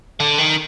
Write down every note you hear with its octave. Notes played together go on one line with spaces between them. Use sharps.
D3
D#3